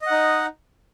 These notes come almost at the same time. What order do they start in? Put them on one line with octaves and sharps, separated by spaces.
D#5 F#5 D#4